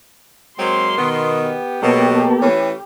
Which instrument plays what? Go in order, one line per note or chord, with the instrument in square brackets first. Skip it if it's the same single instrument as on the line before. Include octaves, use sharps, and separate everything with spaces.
[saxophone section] F#3 G#3 A#3 [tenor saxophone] C4 [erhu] C6
[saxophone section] B2 D#3 [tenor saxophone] B3
[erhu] G4
[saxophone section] B2 [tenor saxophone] F#3 [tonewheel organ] A#3 B3 A4
[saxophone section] A2 E3 [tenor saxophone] C#4